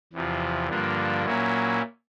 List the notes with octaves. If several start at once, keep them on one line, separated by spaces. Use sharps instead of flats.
E2 C3 F3
G2 D3 F3 A#3 D4
A#2 F#3 A#3 C#4 E4